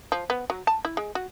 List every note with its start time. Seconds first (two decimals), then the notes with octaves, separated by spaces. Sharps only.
0.12 F3
0.30 B3
0.50 F#3
0.67 A5
0.85 E4
0.97 G#3
1.15 F#4